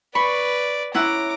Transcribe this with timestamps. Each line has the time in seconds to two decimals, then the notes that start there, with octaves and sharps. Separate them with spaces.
0.15 B4 D5 B5 C#6
0.94 C#4 E4 F#5 A#5 D6